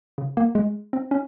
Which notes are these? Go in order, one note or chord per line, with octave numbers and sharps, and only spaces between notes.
C#3
A#3
G#3
C4
C#4